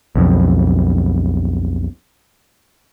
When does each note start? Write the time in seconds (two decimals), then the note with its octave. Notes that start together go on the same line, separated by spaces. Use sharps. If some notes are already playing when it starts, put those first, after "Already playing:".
0.16 B1 F2